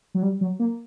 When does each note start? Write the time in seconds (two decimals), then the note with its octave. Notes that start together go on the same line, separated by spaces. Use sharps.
0.14 F#3
0.23 G3
0.41 F#3
0.59 A#3